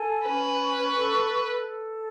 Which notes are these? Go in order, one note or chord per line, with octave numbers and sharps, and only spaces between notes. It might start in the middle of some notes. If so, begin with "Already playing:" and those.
Already playing: A4 G#5
C#4 B4
C#6
A4
A4
A4